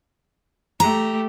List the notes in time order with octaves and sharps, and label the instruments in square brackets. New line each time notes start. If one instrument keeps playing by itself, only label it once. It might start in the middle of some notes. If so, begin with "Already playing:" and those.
[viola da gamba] A3 G4 [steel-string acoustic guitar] A#5